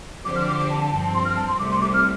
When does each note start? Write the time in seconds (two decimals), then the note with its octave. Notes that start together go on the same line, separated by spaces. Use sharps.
0.25 D3 F3 C4 G4 C5 D6
0.36 F6
0.48 D6
0.59 D6
0.70 A5
0.81 A5
0.92 G2 F3 C4 A5
1.03 A5
1.14 C6
1.25 F6
1.36 A5
1.48 C6
1.59 C2 C3 A3 D6
1.71 C6
1.81 D6
1.94 F6